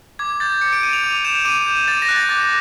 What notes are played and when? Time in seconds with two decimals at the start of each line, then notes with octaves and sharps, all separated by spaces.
0.19 D6 G#6
0.40 G6 A6
0.61 D6 C#7
0.73 D7
0.83 G6 D#7
0.93 F7
1.04 D6 F7
1.25 G6 E7
1.45 D6 D#7
1.66 G6
1.88 D6 A6
2.02 A#6
2.09 F#6
2.16 A6
2.29 D6 A6